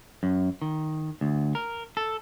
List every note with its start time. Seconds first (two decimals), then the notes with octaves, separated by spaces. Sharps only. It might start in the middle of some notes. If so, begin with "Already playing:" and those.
0.23 F#2
0.62 D#3
1.21 D2
1.55 A#4
1.97 A4